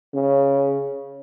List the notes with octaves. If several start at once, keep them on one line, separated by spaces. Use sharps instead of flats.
C#3